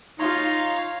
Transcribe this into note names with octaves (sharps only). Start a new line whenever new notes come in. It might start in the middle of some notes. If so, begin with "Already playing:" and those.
D#4 F4 C#5 F5 A#5 C6